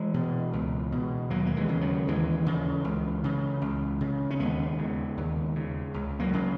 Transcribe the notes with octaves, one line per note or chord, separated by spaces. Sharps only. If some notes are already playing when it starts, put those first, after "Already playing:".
Already playing: E3 G#3
B2
C#2
B2
D#2 F#3 A#3
A#3
E3 G#3
C#3
D#3 F#3
D#2 E3 G#3
C#3
C#2
C#3
C#2
C#3
C#4
D#2 G#3 B3
C#3
D#2
C#3
C#2
F#3 A#3
C#3